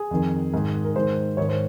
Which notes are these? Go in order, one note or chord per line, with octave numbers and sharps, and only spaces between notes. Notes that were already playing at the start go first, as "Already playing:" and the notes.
Already playing: G#4
F2 D#3
G#2 D#3
A#4
G#2 D#3 C5
G#2 D#3 C#5
C5